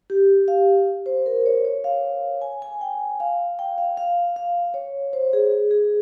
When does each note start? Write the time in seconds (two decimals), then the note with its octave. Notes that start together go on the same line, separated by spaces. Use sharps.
0.10 G4
0.48 F5
1.06 C5
1.26 A#4
1.46 C#5
1.65 C#5
1.84 F5
2.42 G#5
2.62 G#5
2.81 G5
3.20 F5
3.59 G5
3.78 F5
3.97 F5
4.36 F5
4.74 C#5
5.13 C5
5.33 G#4
5.51 G#4
5.71 G#4